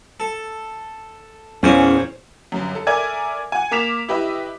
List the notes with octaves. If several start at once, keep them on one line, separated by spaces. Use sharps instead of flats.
A4
A#1 E2 C#4 C5 C#5
G1 F#2
A4
A4 A#4 D5 E5 G#5 G#6
F#5 G#5
A#3 A#4 D6 B6 E7 F7
E4 G4 B4 D#5 E5